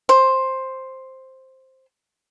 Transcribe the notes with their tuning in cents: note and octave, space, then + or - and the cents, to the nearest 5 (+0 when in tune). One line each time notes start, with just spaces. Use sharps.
C5 +5